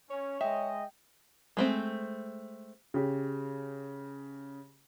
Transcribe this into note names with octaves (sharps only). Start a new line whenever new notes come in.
C#4 C#5
G#3 D#5 E5 G5
G#3 A3 C4
C#3 G4